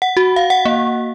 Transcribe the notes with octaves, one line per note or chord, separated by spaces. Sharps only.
F#5
F#4
F5
F#5
A#3